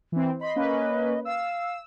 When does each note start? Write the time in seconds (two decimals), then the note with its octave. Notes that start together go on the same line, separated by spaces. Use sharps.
0.12 E3 C4
0.41 D#5 B5 C6
0.56 A#3 C#4 B4
1.25 F5 E6